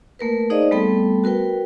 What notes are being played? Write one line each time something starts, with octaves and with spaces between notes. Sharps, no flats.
A3 A#3 A#4 B4
D#4 G#4 C5 D5 D#5 F5
G3 A3 B3 C4 A4 G5
F#4 A#4 B4 G5